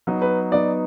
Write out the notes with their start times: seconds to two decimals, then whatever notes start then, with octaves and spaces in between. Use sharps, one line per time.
0.07 F#3 B3 D#4
0.22 B4
0.52 F#3 B3 D#4 D5